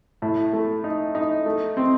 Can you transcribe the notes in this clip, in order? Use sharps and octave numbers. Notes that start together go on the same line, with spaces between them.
A2
A3
D#4
D#4
A3
C4